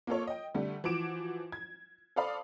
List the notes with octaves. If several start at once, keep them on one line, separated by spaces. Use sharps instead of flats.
A#3 F4 A4 C#5
D#5 G5
D3 G3 A3
E3 F3 F#4 D6 D7 E7
G#6
A4 C5 D5 F5 B5 D#6